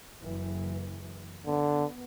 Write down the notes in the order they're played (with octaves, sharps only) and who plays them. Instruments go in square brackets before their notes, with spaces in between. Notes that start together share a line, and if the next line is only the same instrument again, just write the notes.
[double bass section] F#1 E3
[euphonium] D3 [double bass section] B3